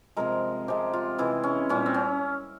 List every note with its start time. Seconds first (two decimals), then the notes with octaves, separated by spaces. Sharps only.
0.17 C3 F3 G#3 A#4
0.68 C3 F3 G#3 G4
0.93 F4
1.18 C3 E3 G#3 E4
1.43 C#4
1.69 A#2 G3 C#4
1.86 C4
1.94 C#4